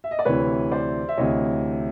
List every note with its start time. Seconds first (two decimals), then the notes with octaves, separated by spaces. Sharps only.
0.04 E5
0.11 D#5
0.19 D5
0.25 D2 C3 E3 B4 C#5
0.71 C5 D5
1.09 E5
1.17 D2 C3 E3 C#5 D#5